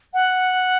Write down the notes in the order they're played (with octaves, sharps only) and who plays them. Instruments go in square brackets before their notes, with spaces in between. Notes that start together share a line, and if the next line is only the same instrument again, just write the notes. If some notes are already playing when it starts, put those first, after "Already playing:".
[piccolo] F#5